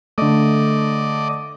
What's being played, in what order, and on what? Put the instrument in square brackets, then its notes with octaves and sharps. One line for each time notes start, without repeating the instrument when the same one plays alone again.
[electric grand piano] D3 A3 [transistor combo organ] D5 D#5